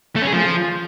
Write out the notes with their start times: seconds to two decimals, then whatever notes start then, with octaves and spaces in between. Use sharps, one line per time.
0.16 A3
0.22 C#4
0.27 G#4
0.33 F3